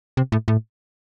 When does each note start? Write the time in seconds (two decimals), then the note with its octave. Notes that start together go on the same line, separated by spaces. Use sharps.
0.17 C3
0.32 A2
0.48 A2